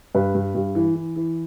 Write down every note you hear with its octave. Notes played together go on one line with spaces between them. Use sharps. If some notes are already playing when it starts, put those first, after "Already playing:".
G2 B4
G2
G2
E3
E3
E3